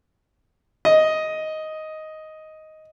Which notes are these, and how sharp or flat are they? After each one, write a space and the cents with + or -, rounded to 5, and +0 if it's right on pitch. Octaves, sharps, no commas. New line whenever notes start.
D#5 +5